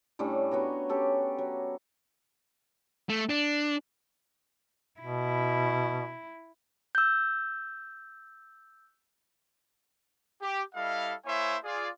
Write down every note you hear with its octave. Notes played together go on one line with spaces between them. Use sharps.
A2 G3 C#4 D4
B3 F#4 C#5 A#5
C#4 G4 A4
F#3
A3
D4
B2 E4
E6 G6
G4
G3 E4 A4 D#5 F5
A#3 E4 C5 C#5 E5 G#5
F4 G#4 D5